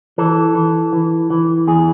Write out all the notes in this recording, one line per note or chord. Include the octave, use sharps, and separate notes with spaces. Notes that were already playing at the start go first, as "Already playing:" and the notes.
E3 A4
E3
E3
E3
E2 G#4